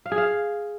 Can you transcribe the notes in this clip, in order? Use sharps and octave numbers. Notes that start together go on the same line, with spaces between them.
F5
G#4
F5